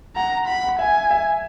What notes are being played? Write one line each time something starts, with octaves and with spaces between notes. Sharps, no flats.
F#5 A#5
F#5 B5
F#5
E5 G#5
E5